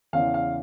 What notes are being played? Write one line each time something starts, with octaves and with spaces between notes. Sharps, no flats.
E2 C#3 E3 F5
F5